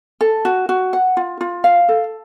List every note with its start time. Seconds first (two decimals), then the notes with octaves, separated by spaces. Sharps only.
0.21 A4
0.45 F#4
0.69 F#4
0.93 F#5
1.17 F4
1.41 F4
1.64 F5
1.88 A4